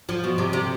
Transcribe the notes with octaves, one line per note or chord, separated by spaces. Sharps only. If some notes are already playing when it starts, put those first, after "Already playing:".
F3
B2
C3
C3